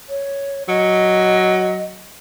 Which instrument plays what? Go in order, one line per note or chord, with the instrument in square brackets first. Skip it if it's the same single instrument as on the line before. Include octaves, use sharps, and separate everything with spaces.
[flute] C#5
[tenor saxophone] F#3 [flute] D#5